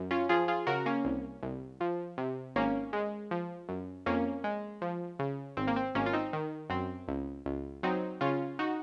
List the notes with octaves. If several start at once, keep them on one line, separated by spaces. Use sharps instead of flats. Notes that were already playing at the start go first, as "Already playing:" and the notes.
Already playing: F#2
C#4 F4
F3 F4 G#4
F4 G#4
C#3 F#4 A#4
A#3 C#4
C2
C2
F3
C3
G#1 A#3 C#4
G#3
F3
F#2
F2 A#3 C#4
G#3
F3
C#3
G#1 C4
A#3
C4
G#1 A#3 C#4
F4
C4 D#4
D#3
F#2 C4
C#2
C#2
F#3 C4 D#4
C#3 C#4 F4
D#4 F#4